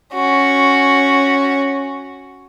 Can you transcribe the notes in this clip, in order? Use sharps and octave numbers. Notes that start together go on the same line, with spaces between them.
C#4 F#4